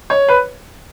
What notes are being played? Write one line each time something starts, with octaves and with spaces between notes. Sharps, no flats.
C#5
B4